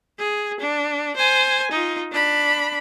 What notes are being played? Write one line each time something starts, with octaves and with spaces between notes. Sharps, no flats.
G#4
D4
C5 G#5
D#4 F4
D4 B5